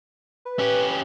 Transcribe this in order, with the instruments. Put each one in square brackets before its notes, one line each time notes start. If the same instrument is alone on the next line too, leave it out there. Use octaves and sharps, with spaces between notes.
[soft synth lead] B4
[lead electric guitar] C#4 G4